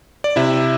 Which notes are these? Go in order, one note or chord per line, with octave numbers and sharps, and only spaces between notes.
D5
C3 E4 E5